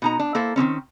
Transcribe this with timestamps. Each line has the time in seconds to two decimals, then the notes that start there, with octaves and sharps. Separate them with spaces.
0.02 B2 D#4 A#5
0.19 D4
0.35 A#3 E4 A4 C5
0.56 D#3 G#3 C4 C#4